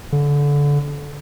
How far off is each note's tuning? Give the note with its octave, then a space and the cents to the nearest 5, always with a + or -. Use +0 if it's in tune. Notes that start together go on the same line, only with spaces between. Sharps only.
D3 -25